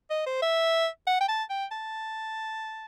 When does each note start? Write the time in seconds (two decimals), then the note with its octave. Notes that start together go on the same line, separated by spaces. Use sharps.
0.10 D#5
0.26 C5
0.42 E5
1.07 F#5
1.21 G5
1.28 A5
1.50 G5
1.72 A5